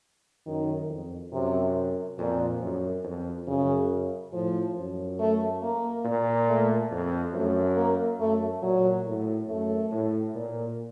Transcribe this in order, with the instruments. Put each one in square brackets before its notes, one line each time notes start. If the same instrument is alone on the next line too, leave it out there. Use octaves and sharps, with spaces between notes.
[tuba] F#2 [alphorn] D#3
[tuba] F2
[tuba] F#2 [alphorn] C3
[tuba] F2 [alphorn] A#2
[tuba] F#2
F2
[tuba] F#2 [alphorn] C#3
[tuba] A2 [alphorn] F3
[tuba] F#2
[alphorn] A3
A#3
[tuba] A#2
[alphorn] A3
[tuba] F2
[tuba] F#2 [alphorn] A3
[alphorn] A#3
[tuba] F#2 [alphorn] A3
[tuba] A#2 [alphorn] F#3
[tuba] A2
[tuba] F#2 [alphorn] A3
[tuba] A2
A#2